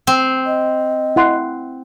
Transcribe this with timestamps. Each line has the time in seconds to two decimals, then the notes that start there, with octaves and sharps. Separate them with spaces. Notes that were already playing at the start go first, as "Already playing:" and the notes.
0.07 C4
0.46 D#5
1.16 E4 F#5 C6